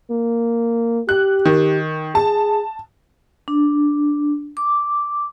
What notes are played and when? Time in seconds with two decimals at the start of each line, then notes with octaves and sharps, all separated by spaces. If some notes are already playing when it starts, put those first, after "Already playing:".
0.11 A#3
1.09 G4 F#6
1.45 D#3
2.15 G#4 A5
3.48 D4
4.57 D6